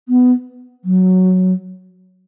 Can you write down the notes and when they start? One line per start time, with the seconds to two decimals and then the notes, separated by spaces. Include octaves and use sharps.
0.09 B3
0.85 F#3